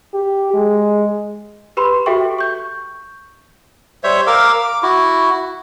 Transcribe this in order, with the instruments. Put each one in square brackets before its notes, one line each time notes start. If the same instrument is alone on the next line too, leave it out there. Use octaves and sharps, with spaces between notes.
[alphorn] G4
G#3
[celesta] G4 B4 B5 C6
F#4 G4 A4 E5 G5 C#6
C#6 G6
[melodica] G3 C5 C#5 E5
A#4 F5 D6 E6
D6
E4 F#4